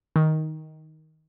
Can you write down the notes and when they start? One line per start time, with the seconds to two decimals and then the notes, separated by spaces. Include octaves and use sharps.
0.16 D#3